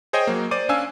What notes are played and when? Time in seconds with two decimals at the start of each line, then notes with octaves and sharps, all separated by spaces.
0.13 G#4 C5 C#5 D#5 G5 G#5
0.27 F#3 A#3
0.51 C5 D5 D6 D#7
0.69 C#4 D4 F5 G#5 E6